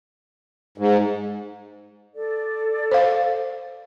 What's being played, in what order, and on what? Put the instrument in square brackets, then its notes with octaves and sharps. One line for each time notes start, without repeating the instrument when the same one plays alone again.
[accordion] G#2
[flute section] A4 D5
[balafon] C5 F5